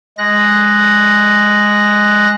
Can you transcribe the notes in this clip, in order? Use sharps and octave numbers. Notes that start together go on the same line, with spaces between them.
G#3 F#6 A#6